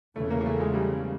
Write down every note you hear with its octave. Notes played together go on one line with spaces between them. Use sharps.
E2 C#3 E3 A3
A#3
A#3
A3
G#3
G3